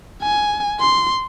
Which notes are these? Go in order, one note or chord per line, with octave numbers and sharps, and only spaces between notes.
G#5
C6